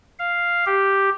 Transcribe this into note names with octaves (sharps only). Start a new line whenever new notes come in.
F5
G4